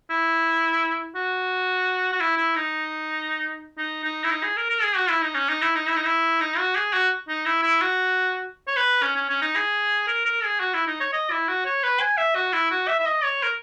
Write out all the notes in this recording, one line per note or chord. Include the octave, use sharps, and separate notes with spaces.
E4
F#4
F#4
E4
E4
D#4
D#4
D#4
E4
D#4
G#4
A#4
A#4
G#4
F#4
E4
D#4
C#4
D#4
E4
D#4
E4
D#4
E4
D#4
F#4
G#4
F#4
D#4
E4
E4
F#4
C#5
B4
C#4
C#4
C#4
D#4
G#4
A#4
A#4
G#4
F#4
E4
D#4
C#5
D#5
E4
F#4
C#5
B4
G#5
E5
F#4
E4
F#4
E5
E5
D#5
C#5
A#4